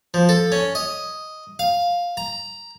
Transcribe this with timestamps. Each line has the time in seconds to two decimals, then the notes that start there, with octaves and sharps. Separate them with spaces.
0.14 F3
0.29 A4
0.52 C#4
0.75 D#5
1.59 F5
2.17 A#5